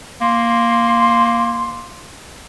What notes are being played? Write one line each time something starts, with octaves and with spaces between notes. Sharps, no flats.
A#3 C6